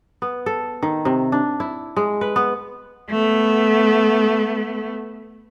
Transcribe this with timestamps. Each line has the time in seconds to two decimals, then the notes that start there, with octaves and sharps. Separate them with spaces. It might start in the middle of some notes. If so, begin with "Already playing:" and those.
0.22 B3
0.46 A4
0.83 D#3
1.05 C3
1.32 D4
1.60 E4
1.96 G#3
2.21 B4
2.36 B3
3.10 A3 B3